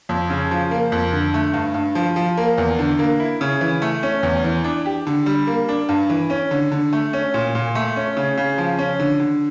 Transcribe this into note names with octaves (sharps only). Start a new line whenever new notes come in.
F2
C#3
F3
A#3
F2
D3
A3
G2
G2
F3
F3
A#3
E2
D3
A#3
E4
C#3
E3
A3
C#4
E2
E3
D4
G4
D3
G3
A#3
D4
G2
E3
C#4
D3
D3
A3
C#4
A#2
A#2
A3
C#4
C#3
C#3
F3
C#4
D3
D3